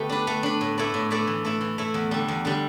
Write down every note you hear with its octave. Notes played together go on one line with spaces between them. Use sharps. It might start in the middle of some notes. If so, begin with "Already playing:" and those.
Already playing: D3 A3 B3 G4
D4 B4
A3
D4 B4
A2
A3 E4 B4 D5
A2
A3 E4 B4 D5
E3
A3 E4
E3
A3 E4
E2
D3 G3
E2
D3 G3